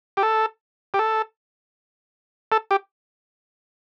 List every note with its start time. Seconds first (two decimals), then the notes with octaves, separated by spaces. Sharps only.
0.17 G4
0.23 A4
0.94 G4
0.99 A4
2.52 A4
2.71 G4